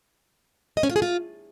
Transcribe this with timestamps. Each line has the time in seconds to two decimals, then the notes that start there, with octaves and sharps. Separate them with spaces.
0.77 D#5
0.83 C#4
0.89 F4
0.96 G#4
1.02 F4